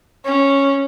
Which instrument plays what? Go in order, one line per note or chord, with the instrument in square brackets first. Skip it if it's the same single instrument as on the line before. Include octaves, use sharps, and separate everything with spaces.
[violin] C#4